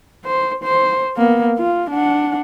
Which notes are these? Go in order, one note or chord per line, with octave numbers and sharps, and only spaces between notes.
C5
C5
A#3 B3
F4
D4 F#5